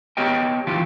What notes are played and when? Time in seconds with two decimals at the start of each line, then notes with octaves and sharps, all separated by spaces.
0.17 B3 G4 C#5 D#5 G5
0.67 D#2 E3 F3 F4 G4